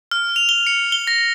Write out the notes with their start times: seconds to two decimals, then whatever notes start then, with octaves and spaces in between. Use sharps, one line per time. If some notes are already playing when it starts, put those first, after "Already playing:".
0.11 F6
0.36 F7
0.49 G7
0.67 C#7
0.92 G7
1.07 A#6